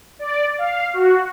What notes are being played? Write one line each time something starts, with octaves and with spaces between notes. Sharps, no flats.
D5
F5
F#4